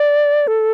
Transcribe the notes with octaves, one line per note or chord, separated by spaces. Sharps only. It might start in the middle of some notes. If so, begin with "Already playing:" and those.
Already playing: D5
A4